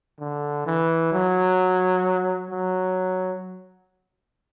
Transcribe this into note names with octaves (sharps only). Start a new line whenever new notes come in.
D3
E3
F#3
F#3